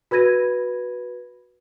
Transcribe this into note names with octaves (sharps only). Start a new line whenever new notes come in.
F#4 B4 B5 G#6 A#6 D#7